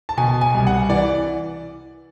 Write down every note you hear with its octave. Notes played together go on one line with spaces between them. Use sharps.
A5
B2 G#5
G#5
C2
F#5
E3 D5